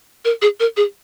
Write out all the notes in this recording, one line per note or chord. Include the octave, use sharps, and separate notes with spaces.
A#4
G#4
A#4
G#4